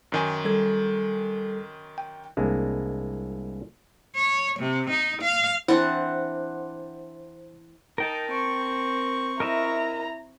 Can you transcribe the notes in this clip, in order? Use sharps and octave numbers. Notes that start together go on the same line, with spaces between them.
F#2 D#3 G#5
G3 A4 G#6
G5
C2 G#3 A#3 D4
C#5
C3
D#4
F5
E3 C4 D4 E4 C5 F#5
D#4 A#4 G5 A5
C4 C#6
E4 A#4 D#5 E5 A#5